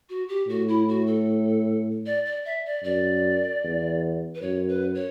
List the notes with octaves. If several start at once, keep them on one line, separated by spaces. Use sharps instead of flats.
F#4
G4
A2 F#4
E4
F#4
A4
D5
D5
E5
D5
F#2 D5
E2
B4
F#2 C#5
B4
C#5